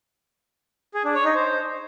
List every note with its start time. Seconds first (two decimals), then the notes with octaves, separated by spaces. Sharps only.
0.94 G#4
1.04 D4
1.15 C#5
1.25 D#4
1.35 C5